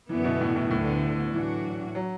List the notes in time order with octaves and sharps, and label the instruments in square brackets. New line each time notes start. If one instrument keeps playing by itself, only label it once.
[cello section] F#2 D3 B3 E4 [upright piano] E3
[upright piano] B2
A2
A2
[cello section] D2 D3 B3 [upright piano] A2
[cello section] A2 F#3 D4 F#4 [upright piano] E3
[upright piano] F#3